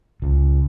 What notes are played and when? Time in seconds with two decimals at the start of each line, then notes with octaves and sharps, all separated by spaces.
0.22 C#2